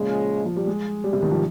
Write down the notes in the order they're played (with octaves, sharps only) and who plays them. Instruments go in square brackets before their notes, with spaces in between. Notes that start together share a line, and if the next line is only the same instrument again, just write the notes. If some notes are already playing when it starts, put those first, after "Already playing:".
Already playing: [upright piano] A#2 [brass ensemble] C#3 F3 G#3
[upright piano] F3
G3
G#3
G3
C3
D#3
F3